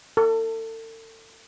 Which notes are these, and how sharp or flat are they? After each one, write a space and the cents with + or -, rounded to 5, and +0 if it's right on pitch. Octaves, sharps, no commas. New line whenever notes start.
A4 +35